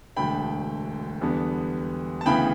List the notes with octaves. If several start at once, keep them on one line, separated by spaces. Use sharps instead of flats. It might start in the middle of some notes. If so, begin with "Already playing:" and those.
E1 D2 D3 G5 B5
E2 D3 G3 B3
A5
D2 C#3 E3 B3 G5 B5